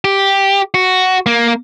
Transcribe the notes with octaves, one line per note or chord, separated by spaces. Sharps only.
G4
F#4
A#3